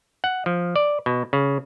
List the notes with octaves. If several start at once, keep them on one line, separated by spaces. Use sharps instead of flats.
F#5
F3
D5
B2
C#3